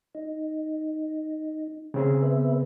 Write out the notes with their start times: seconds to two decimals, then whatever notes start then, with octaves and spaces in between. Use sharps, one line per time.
0.15 D#4
1.94 C#3 C4 G#4
2.22 B3 B4 E5